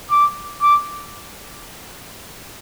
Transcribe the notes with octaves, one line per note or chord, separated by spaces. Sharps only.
D6
D6